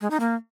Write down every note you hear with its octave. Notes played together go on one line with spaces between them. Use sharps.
G#3
D#4
A#3